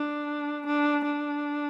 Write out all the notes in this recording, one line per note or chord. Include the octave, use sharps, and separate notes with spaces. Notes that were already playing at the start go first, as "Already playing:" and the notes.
Already playing: D4
D4
D4